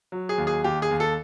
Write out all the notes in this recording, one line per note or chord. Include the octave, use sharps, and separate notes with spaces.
F#3
G#4
D#2
G#4
D#2 G4
G#4
D#2
A4